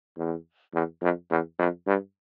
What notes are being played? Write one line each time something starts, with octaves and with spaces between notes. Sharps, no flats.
E2
E2
F2
E2
F2
G2